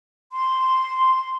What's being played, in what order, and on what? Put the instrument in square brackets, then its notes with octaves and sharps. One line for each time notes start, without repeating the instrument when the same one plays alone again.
[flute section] C6